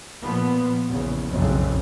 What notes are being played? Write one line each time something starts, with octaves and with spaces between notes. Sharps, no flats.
A#2 F3 B3
A#1 E2 C#3
F#1 B1 F2 C#3 C4